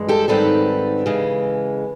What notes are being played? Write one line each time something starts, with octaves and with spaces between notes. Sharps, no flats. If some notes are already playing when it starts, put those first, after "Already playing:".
Already playing: G2 E3 G#3
G4 A4
G#2 D#3 G3 C4 A4 B4
C#3 E3 G#3